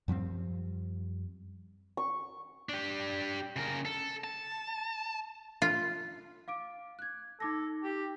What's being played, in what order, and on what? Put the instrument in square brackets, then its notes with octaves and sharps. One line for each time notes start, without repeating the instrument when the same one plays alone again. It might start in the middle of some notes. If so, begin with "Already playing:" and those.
[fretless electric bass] F#2 F3 G3 C4
[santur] C#6
[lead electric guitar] D4 G4
C#3 A#4
A4
A5
[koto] F4
[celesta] F5 D6 D7
F#6 G#6
[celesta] D#4 D6 A#6 [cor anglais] A4
[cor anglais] G4